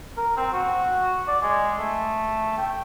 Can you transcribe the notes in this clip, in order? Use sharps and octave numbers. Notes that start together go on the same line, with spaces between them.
A#4
C4
F#4
D5
G#3
A3
G5